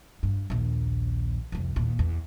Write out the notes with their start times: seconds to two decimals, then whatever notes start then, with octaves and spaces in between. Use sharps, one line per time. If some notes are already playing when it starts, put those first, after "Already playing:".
0.23 G2
0.50 A#1 D#2
1.52 C2 F2
1.76 D#2 A#2
1.99 E2